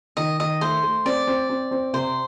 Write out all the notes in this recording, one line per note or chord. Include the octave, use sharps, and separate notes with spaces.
D#3 D#5
D#3 D#5
A3 C5
A3
C4 D5
C4
C4
C4
C3 C5